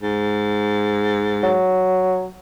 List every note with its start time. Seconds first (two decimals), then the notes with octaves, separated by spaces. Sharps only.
0.01 G#2
1.43 F#3